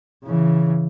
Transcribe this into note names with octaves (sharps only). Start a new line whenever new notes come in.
C#3 E3